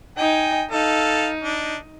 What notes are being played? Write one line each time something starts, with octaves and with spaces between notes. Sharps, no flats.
D#4 G5 G#5
D#4 A4 F5
D4